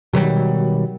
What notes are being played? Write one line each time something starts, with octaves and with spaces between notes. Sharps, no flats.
B2 D#3 F#3 G3